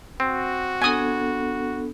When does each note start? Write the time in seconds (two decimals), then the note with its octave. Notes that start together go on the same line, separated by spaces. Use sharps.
0.20 C4 F#4
0.82 B3 D4 A4 G#5 D#6